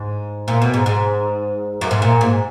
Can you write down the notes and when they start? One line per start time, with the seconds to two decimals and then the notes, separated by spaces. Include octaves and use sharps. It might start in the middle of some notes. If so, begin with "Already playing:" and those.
Already playing: G#2
0.48 A#2
0.62 B2
0.74 G#2
0.86 G#2
1.81 F#2
1.91 G#2
2.02 A#2
2.21 G#2